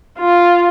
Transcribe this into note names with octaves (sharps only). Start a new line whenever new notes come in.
F4